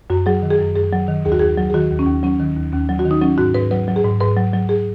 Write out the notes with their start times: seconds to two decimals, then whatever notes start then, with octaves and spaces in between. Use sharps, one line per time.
0.10 F#2 F#4
0.26 F#3 G#4
0.43 D#3
0.50 G#4
0.60 F#2
0.75 F#2 G#4
0.93 F#3
1.08 D#3
1.25 D#2 G#4
1.32 F#4
1.39 D#2 G#4
1.58 F#3
1.70 G#4
1.74 D#3 F#4
1.90 D#2
1.99 C#4
2.07 D#2
2.23 F#3 C#4
2.40 D#3
2.57 D#2
2.73 D#2 C#4
2.89 F#3
2.99 F#4
3.05 D#3
3.11 D#4
3.21 F#3 C#4
3.38 G#2 F#4
3.54 G#2 B4
3.71 F#3 B4
3.88 F#3
3.96 G#4
4.04 G#2
4.20 G#2 B4
4.37 F#3
4.53 F#3
4.69 G#4